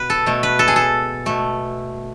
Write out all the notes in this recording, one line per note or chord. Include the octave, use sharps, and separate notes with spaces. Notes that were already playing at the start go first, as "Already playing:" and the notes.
Already playing: B2 B4
A4
B2 A3
B4
A4
G#4
A4
B2 A3